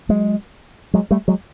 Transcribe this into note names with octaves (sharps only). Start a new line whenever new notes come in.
F#3 G#3
F#3 G#3
G3 A3
F#3 G#3